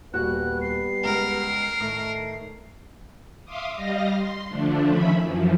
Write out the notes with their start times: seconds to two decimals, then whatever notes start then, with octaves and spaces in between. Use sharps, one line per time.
0.14 D#1 G3 B3 F#4 F#6
0.61 C7
1.05 C#2 A#4
1.81 A2 D#3 A3
3.45 E5 F5 C6 D6 D#6
3.75 G3 D#5 F5 A#6
4.12 C6
4.49 D3 F3 A3 D4
4.88 D#3 F3 C#4 E5 B5
5.20 F#2 E3 F3